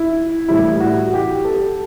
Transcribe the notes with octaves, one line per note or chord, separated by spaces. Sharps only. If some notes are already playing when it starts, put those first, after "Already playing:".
Already playing: E4
A2 E3 G3 E4
F#4
G4
A4